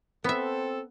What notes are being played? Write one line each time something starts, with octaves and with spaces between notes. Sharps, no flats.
B3 C4 A4 E5